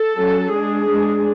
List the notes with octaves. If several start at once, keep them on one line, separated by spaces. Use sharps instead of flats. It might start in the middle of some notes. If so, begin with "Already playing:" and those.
Already playing: A4
F#3 C#4
G#3 D4 G#4
G#3 D4